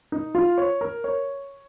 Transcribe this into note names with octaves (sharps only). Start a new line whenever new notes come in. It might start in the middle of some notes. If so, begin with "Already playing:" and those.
D#4
F4
C#5
A#4
C#5